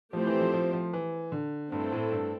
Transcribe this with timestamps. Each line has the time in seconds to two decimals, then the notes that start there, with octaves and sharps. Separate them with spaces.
0.13 F3 A3 C4 E4 G4 C5
0.27 E3
0.40 F3
0.54 F3
0.73 F3
0.93 E3
1.32 D3
1.72 G2 A3 C4 E4 A4
1.92 A2
2.12 G2